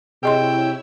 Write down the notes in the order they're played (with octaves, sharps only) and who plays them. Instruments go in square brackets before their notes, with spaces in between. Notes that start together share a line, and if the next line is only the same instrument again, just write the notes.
[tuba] C3 [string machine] E4 C#5 E6 [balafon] G#4 D#5 C6 [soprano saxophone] G5